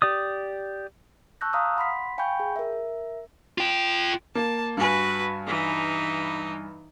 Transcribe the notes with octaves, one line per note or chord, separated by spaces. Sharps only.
G4 D5 D#6
A5 C#6 E6 F#6 G6 A#6
F5 A#5 D#6 F6
F#5 B5 C6 B6
F5 G5 G#5 B5 C#6 G6
G#4
A#4 E5
F4 G5
A#3 A5
G2 F#4 B4 G#5
E3 D#4